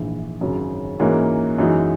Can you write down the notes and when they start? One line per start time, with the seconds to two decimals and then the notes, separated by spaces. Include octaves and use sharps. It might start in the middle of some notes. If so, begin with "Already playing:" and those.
Already playing: A#1 G#2 E3
0.41 G#1 F#2 C#3 F#3
1.00 G#2 E3 A#3 C#4 F#4
1.58 F#2 E3 G#3 D#4 F#4